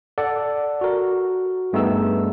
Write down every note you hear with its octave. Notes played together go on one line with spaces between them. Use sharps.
A4 D5 F#5
F#4 A#4
G2 A3 B3 D#4 G#4 E6